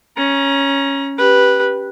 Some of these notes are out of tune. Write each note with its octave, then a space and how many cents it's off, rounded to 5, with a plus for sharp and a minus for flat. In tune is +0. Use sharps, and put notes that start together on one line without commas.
C#4 +0 A#5 +25
G4 +0 B4 -10